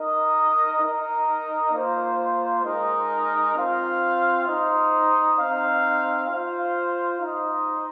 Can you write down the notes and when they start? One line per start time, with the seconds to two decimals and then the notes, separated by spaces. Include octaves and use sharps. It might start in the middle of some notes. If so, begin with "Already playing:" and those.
Already playing: D#4 A#4 D#5
0.81 D#4 A#4 D#5
1.72 A#3 F4 C5 F5
2.63 G#3 D#4 A#4 D#5
3.55 C4 F4 C5 F5
4.46 D#4 C5 D#5
5.37 C4 D#4 C5 F5
6.29 F4 C5 F5
7.20 D#4 C5 D#5